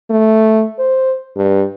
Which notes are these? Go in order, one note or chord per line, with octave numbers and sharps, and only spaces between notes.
A3
C5
G2